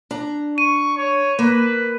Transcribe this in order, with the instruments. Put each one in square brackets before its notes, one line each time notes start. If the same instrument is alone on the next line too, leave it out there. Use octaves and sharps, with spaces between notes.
[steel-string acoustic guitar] D4 A#5
[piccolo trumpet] C#6 [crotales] D#7
[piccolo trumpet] C#5
[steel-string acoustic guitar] A#3 [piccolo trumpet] B4